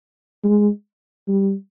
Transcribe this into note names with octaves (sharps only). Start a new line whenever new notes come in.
G#3
G3